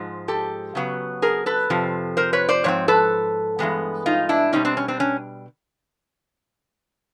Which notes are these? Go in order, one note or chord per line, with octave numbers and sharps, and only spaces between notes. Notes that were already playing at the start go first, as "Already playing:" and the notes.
Already playing: G#2 F3 G#3
G4 A4
C#3 F#3 B3
G#4 A#4
A4 B4
F2 C3 F3
A#4 C5
B4 C#5
C5 D5
G#2 F3 C4 C#5
A4 B4
G2 E3 G#3 B3
D#4 F4
D4 E4
B2 G3 C4 C#4 D#4
C4 D4
C#4
C4 D4
C#4